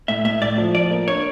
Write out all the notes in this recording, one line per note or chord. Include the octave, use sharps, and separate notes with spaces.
A2 E5
A2 E5
A2 D5
F3
F3 D5
A#3
D4 C#5